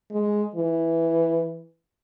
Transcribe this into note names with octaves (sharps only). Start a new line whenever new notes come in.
G#3
E3